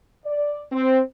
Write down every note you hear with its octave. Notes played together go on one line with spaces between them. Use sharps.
D5
C4